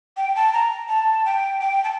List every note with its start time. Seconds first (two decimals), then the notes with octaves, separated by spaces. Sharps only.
0.17 G5
0.35 A5
0.53 A#5
0.88 A5
1.25 G5
1.60 G5
1.84 A5